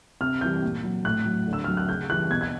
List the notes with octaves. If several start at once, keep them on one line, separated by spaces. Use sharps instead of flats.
C3 F6
E3 G3 G6
A#2
F#3
A2 F#6
F#3
D3
E6
F#3 F6
F#6
C#3 G6
E3 G3 F#6
B2 G#6
G#6